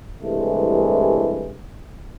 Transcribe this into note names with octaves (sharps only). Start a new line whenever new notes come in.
C2 G2 E3 G#3 A3